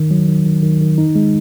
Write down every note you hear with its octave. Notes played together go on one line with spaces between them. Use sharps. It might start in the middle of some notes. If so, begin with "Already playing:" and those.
Already playing: D#3
F#3
D#3
D#3
D#3
D#3
D#4
G#3